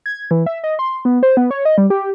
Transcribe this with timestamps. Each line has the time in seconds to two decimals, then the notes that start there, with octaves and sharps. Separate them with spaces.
0.06 G#6
0.31 E3
0.46 E5
0.64 D#5
0.79 C6
1.05 B3
1.23 C5
1.37 B3
1.51 C#5
1.65 D#5
1.78 G3
1.90 G4